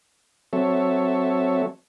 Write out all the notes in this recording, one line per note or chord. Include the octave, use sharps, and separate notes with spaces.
F#3 C4 A4 C#5 E5